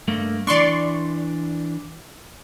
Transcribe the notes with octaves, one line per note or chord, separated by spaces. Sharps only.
G2 A3 A#3
E3 D4 D5 C6 C#6